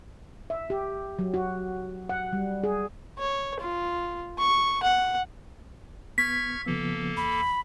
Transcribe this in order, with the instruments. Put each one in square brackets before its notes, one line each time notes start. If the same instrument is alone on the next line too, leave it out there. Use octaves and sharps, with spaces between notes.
[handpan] E5
G4
F#3
F#4
F#5
G3
G#4
[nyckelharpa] C#5
F4
C#6
F#5
[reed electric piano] B3 [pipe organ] C#6 F6 G#6 [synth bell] B6
[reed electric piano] C#3 F3 B3 [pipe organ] A#3 A4
[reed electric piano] E2 [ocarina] B5